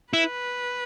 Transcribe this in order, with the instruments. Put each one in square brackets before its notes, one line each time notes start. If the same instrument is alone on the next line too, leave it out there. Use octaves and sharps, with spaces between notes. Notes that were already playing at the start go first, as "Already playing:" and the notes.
[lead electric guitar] E4 [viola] B4